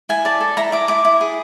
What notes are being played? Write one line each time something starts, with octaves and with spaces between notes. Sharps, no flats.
E4 G#5
D5 A5
A4
E4 A#5
E4 D6
E4 D6
E4
G#4